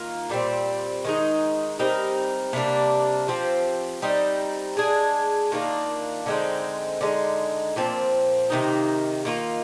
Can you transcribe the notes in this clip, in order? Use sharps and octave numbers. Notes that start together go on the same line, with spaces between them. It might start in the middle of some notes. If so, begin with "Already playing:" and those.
Already playing: D#3 A#3 F4 A#4
A#2 G3 C4
D#3 G#3 D#4
G3 C4 D#4 A#4
C3 G3 A#3 D4
F3 C4 G4
G3 C4 D#4
G#3 D4 G#4
D#3 A#3 D4 F4
D3 G#3 C4 D#4
D3 G#3 D#4
A#2 F3 C4
C3 D#3 A#3 D#4
D#3 A#3 F4